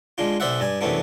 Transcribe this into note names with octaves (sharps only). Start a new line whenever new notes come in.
G#3 D4 F4
B1 C5 D5 E5 F#5
G2 D5 G#5
F#2 C3 E3 A3 B3 D4